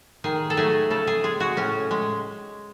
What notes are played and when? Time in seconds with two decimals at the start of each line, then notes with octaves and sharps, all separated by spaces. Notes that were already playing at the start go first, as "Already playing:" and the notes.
0.24 D#3 G#4
0.50 A4
0.57 F#3 A3 G#4
0.90 C#3 A4
1.07 G#4
1.24 G#3 G#4
1.40 F#4
1.57 A2 C#4
1.91 G#3